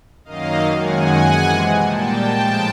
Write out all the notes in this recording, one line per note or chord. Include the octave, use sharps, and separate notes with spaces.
F#2 D#3 F#3 A#3 D#5 F5
F#2 D#3 G#3 F#5 G#5
C3 E3 G#3
A#2 G3 A#3 G5 A5
A2 F3 G#3